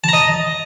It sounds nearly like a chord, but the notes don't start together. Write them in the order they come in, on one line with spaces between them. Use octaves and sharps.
A5 A#5 D#5